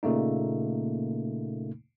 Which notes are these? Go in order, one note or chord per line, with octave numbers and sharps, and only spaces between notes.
A#2 C#3 A3 A#3 D#4